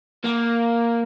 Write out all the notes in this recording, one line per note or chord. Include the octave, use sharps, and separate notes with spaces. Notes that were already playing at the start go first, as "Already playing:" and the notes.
A#3